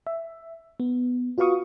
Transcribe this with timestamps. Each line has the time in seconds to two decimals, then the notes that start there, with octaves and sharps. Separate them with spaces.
0.07 E5
0.80 B3
1.38 F4 F#4 B4 F5 C#6 D#6